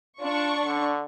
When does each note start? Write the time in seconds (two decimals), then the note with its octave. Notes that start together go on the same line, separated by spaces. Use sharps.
0.21 D4 F4 C#6
0.65 D3